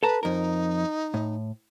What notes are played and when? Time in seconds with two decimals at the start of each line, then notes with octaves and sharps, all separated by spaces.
0.03 A4 B4 A5 A#5
0.23 F2 D#4 A#4
1.14 A2